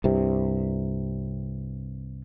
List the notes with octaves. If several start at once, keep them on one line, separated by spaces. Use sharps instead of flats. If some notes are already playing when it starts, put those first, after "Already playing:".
C2 G2 C3